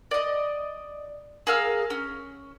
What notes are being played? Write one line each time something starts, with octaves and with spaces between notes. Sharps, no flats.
D5 D#5
G#4 A#4 F5 E6
C#4